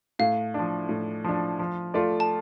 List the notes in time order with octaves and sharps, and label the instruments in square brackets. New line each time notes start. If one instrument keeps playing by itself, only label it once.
[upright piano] A2 [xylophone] F5
[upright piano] F3 D4
A2
F3 D4
F3
A3 F4 D5
[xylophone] A5